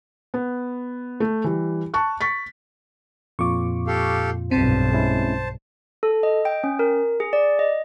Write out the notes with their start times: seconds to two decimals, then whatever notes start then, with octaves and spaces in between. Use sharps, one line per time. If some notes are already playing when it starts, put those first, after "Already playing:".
0.34 B3
1.20 A3
1.44 E3 G3
1.94 A5 C#6 F#6
2.21 C#6 A6 B6
3.39 F2 A#2 F4 C#6 D6
3.87 G4 A4 F5
4.51 B1 G2 C4 C5 A5
4.92 G#3 C#4 E4
6.03 A4
6.23 D#5
6.45 G5
6.64 C#4
6.79 A#4
7.20 G#4
7.33 D5
7.59 D#5